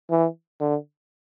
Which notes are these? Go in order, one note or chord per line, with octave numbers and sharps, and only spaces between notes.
E3
D3